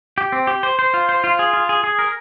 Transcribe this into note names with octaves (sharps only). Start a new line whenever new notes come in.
G4
C4
G4
C5
C5
F4
C5
F4
G#4
F4
G#4
G#4
A#4